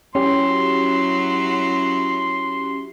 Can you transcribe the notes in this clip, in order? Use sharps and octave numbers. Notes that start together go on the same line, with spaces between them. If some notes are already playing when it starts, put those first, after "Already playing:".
F#3 C#4 E4 F#4 G4 C6